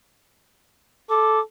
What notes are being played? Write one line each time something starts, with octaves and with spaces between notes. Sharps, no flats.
A4 D6